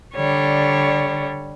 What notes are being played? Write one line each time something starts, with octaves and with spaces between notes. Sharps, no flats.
D3 G3 C#5